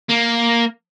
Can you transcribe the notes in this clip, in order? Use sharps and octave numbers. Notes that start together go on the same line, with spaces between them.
A#3